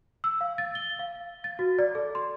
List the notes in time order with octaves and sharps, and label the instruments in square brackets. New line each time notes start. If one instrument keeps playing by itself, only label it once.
[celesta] E6
F5
A6
G7
F5
A6
F#4
D5
A4
C6